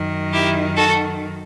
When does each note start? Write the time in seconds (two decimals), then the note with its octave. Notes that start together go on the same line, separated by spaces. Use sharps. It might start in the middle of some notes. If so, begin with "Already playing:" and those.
Already playing: F#2 D#3
0.32 E4 G4
0.76 F#4 A4